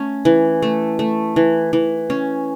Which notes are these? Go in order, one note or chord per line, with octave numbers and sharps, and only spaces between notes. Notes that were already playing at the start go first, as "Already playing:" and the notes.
Already playing: A3 C#4
E3
A3
A3
E3
E3
C#4